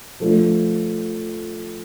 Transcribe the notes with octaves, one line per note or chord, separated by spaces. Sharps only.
F3 A3 D4